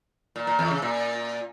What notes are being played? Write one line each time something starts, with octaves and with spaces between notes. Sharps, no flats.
A#2
A#2
E2
C#3
A#2